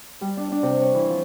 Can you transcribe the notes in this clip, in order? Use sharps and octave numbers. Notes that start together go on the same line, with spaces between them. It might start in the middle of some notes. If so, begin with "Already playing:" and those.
G3
D4
D4
C3
C#5
E3
F3